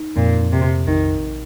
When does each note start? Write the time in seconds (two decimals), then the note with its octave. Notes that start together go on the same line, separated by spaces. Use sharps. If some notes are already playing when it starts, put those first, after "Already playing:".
Already playing: D#4
0.16 F2 A#2
0.39 F2
0.52 C3
0.63 F2
0.87 A#1 D#3
1.11 A#1